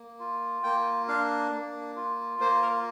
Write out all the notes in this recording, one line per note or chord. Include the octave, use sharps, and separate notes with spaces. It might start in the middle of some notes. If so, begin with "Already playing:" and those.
Already playing: A#3
F4
A#3 G5
D4 F5
A#3
F4
A#3 C5
A#4